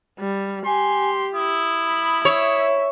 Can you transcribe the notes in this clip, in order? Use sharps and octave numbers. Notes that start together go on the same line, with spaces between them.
G3
G4 G#5 C6
E4 D#6
B5
C#5 E5